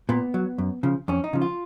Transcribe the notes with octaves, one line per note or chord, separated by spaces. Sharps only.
A#2 B3
F#3
F#2
C#3 F3
F2 C#4
D#4
C#3 F3
F4